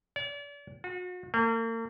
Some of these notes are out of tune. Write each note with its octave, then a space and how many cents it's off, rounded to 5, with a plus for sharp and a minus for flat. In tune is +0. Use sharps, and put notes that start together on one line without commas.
D5 -40
F#4 -40
A#3 -40